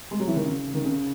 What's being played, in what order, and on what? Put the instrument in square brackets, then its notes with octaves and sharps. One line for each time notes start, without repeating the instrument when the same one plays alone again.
[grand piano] G#3
F#3
E3
D#3
C#3
D#3
C#3